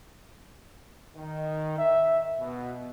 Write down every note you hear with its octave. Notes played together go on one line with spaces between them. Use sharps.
D#3
E5
B2